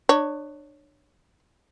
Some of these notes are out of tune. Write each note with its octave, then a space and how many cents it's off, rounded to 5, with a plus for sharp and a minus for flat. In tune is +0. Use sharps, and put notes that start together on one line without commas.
D4 +30 C#5 +0